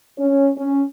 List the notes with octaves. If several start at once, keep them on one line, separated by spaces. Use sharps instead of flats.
C#4
C#4